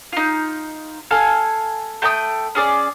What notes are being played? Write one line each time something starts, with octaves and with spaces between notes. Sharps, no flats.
D#4 F4
A4 F5 G#5
A3 G5 A#5 D#6
C#4 G#4 D5